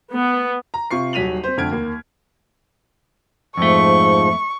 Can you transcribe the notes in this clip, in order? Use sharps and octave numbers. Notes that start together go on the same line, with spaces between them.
B3
A#5
C3 F4 C#6 C7
D#1 F#3 B6 D#7 F7 F#7
C4 C5
F2 D3 A3 F6 G#6 D7
D#2 A#3
F2 G#2 F3 A3 C#6